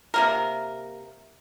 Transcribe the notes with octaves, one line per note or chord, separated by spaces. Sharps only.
C3 A#3 A#4